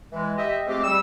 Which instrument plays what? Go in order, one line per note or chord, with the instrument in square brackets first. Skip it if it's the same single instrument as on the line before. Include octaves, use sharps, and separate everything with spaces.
[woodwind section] E3 G#3
G4 D#5 E5
F3 G#3 A3 C4 G4
G3 E6